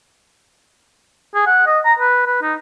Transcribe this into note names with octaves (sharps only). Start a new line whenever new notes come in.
G#4
F#5
D#5
A#5
B4
B4
D#4